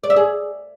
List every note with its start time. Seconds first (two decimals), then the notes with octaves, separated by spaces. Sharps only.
0.03 D5
0.10 E5
0.16 G#4